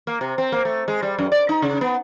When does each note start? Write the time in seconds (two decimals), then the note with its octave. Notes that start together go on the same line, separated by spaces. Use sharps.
0.07 A#3
0.21 C3
0.38 C4
0.52 A#3
0.65 A3
0.88 G#3
1.02 G3
1.19 F#2
1.32 D5
1.49 D#4
1.62 C#3
1.81 B3